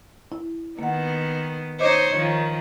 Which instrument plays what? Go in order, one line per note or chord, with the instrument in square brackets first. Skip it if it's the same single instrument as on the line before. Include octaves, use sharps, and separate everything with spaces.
[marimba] E4
[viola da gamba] D#3 B3 [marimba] A#3 F#5
[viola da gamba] D#4 C5 C#5 [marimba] D#5 D6
[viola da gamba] D#3 F3